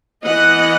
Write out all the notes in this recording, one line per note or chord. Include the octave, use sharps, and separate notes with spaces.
E3 B3 D#5 F#5